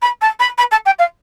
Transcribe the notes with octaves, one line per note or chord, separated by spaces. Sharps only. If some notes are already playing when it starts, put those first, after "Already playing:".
B5
A5
B5
B5
A5
G5
F5